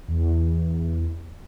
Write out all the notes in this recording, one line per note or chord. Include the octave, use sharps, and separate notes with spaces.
E2